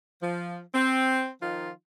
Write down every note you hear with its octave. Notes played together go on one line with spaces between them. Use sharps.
F3
C4
D#3 F3 D#4 F4